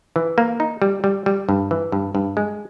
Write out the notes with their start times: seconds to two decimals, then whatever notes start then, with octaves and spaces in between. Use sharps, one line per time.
0.16 E3
0.38 A#3
0.60 D#4
0.82 G3
1.04 G3
1.26 G3
1.49 G2
1.71 E3
1.92 G2
2.15 G2
2.37 G#3